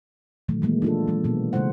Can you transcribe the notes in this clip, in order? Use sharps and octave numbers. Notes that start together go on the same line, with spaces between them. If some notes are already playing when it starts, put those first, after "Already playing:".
A#2 D#3 E3 F#3 A3
E3 G#3 A#3
D4 F4 A4
E3 F#3 G#3
B2 B3
C#3 G#3 E4 C5 F#5